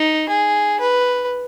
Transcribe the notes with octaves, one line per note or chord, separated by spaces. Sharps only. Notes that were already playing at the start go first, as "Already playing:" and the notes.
Already playing: D#4
G#4
B4